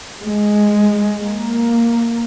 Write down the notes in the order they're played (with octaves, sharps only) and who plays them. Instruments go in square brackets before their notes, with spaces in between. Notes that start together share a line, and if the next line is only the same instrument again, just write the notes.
[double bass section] G#3
A#3